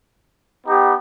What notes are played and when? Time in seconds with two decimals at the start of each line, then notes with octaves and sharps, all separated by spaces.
0.67 B3 D#4 G4